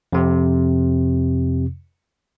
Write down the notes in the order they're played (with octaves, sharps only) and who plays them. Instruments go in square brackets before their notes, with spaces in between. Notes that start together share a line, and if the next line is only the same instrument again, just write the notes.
[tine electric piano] F2 C3